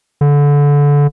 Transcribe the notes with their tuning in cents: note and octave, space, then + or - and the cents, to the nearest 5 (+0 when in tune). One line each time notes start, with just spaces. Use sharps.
D3 -25